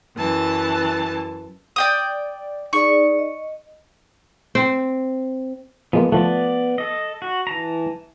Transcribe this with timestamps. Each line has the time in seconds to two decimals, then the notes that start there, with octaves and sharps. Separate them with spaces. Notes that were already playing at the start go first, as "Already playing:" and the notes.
0.16 F#2 E3 A5
1.76 D5 G5 D#6
2.73 D#4 G#4 D5 C#6
3.19 D#5
4.55 C4
5.93 F3 G#3 A#3 B3
6.12 F3 A3 B3 D5
6.78 A4 D#5
7.22 F#4
7.47 E3 A5 A#5